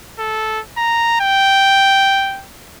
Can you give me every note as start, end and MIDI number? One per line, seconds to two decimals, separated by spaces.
0.19 0.60 69
0.78 1.18 82
1.20 2.44 79